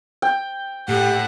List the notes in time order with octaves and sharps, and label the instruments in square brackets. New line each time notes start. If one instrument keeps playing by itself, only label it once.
[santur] G5
[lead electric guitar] A2 [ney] G4 [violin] F#5